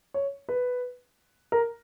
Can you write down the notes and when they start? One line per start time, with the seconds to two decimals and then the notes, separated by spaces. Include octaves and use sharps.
0.14 C#5
0.49 B4
1.52 A#4